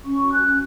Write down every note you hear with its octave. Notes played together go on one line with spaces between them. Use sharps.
C#4 C#6
F#4
F#6
F#4